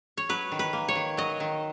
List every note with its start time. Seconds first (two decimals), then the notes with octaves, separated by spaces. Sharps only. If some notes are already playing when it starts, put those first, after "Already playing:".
0.17 C#5
0.29 F#3 B4
0.52 D#3
0.59 B4
0.73 A#3
0.88 C#5
0.95 D#3
1.17 F#3 D#5
1.40 D#3